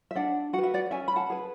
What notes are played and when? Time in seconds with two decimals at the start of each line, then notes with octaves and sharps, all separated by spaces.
0.11 E5
0.15 D4 D5 F#5
0.53 F#4 F#5
0.58 B4 E5
0.74 D5 F#5
0.91 C#4 E5 G#5
1.08 B5
1.16 F#5 A5
1.30 G#4 B4